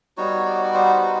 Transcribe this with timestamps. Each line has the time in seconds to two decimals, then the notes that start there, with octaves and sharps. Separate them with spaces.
0.17 G3 B3 D#4 F#4 C#5
0.46 D5
0.54 C#5
0.63 D5
0.74 C5
0.93 B4